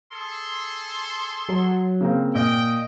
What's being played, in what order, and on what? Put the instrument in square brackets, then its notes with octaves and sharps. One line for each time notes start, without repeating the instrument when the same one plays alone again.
[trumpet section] G#4 A4 C6
[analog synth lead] F#3
[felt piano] C#3 A#3 C4
[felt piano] A#2 [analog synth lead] D#5 [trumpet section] G5